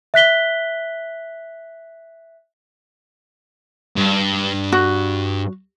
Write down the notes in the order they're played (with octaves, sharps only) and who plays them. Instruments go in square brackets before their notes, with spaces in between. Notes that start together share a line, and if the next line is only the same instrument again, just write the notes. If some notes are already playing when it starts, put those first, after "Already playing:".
[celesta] E5 F#6 B6 G7
[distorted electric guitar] G2
[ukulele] F#4